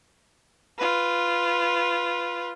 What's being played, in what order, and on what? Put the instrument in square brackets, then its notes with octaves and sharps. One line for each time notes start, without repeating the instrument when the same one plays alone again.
[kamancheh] F4 B4